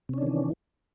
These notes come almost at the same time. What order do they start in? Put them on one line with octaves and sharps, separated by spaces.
C3 C#4 D4 D#3 E3